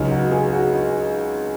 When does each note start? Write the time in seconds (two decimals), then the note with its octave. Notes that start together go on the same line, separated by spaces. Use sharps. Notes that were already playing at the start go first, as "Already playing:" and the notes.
Already playing: C#2 C#3 F#3 D#4
0.11 F#4
0.31 G#4
0.53 F#4
0.74 D#4